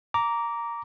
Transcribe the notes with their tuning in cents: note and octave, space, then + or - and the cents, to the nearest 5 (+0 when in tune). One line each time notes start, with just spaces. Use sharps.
A#5 +0 D6 -15